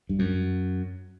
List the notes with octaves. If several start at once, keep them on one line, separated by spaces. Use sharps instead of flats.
G2
F#2